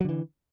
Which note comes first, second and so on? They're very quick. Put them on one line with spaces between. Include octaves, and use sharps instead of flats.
F#3 D3 E3